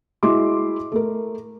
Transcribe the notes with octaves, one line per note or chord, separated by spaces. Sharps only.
G#3 E4 F#4 C6 D6
A3 A#4